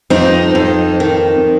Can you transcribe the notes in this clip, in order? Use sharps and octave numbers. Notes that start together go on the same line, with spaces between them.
F2 C4 D#4
F2
D#3